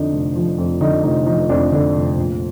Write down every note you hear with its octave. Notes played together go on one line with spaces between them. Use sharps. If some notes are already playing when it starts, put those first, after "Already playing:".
Already playing: F2 D3 D4 D#4
F1
F3
F2
D3 D#4
F1 D#4
F3 D#4
F2 D4
D3 D4
F1
A#1